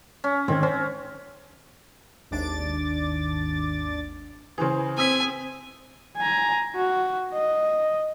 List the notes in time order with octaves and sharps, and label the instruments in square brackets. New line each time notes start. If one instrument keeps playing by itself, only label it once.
[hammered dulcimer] C#4
[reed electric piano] G#2 D#3 G#6 [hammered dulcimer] C4
[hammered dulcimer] C#4 [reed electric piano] C5
[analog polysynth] G#1 D#2 D4 D6 A6
[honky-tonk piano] C#3 E3 [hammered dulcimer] G#4 C5
[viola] C4 [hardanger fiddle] G#5 [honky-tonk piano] D#6 E6 B6
[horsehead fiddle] G#5 A#5
F#4
D#5